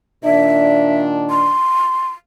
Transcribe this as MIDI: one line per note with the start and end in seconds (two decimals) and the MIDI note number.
0.24 1.56 46
0.24 1.56 51
0.24 1.56 62
0.24 1.00 76
1.30 2.08 84